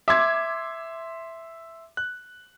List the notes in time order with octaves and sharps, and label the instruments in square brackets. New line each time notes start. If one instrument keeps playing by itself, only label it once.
[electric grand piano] E5 C6 [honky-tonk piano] D6 G#6
[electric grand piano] F#6